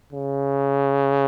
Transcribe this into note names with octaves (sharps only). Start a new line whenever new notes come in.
C#3